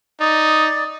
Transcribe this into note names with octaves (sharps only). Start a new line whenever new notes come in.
D#4 D5 D#6